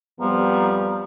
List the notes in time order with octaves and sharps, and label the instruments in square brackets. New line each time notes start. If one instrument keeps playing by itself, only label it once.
[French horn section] F2 G3 [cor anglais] F3 [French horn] B3 [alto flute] A#5